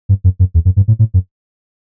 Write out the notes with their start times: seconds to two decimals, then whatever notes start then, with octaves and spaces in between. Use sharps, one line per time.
0.09 G2
0.24 F#2
0.39 F#2
0.54 E2
0.65 F#2
0.76 G2
0.88 A2
0.99 A2
1.14 F#2